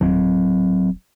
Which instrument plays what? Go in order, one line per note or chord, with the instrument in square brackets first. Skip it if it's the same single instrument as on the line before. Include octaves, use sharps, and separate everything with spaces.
[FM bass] D#1 [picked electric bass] F#3 C4